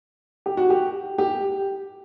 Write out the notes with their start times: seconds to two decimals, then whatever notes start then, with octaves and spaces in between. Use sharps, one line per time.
0.46 G4
0.57 F#4
0.70 G4
1.18 G4